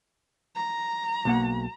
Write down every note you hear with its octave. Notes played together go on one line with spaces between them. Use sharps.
A#5
B1 A#3 F#5